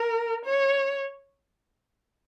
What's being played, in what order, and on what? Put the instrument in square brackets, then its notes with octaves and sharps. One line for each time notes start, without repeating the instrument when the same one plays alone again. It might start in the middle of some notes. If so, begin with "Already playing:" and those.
Already playing: [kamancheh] A#4
C#5